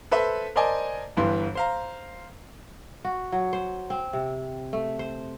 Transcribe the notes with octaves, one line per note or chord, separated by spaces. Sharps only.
A4 B4 C5 E5
A#4 C5 D5 D#5 G#5 A5
G1 G2 E3 B3 C6
C5 F5 A#5
F#4
F#3
C5
C4
C3
A3
C5